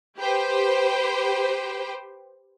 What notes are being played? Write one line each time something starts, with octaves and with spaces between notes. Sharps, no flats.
G4 B4 C5 G5